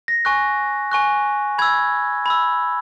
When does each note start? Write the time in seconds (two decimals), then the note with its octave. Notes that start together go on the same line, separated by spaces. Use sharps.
0.08 A#6
0.25 G#5 C#6 F#6
0.91 G#5 C#6 F#6
1.58 B5 E6 G#6
2.26 B5 E6